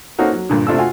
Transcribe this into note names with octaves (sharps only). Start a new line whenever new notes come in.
A#3 C4 C#4 D#4 F#4 A4
F#3
G2 A#2 D3
C3 A3 D4 F4 A4 E6
F4 F#4 G#5